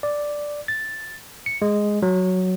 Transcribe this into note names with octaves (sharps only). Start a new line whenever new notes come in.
D5
A6
C#7
G#3
F#3